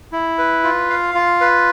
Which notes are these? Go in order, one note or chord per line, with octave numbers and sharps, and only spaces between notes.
E4
B4
F4
F5
F4
B4